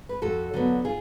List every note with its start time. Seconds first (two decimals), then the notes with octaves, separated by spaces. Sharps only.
0.09 B4
0.22 F2 F#4 A4
0.54 D3 F#3 B3
0.85 F4 G#4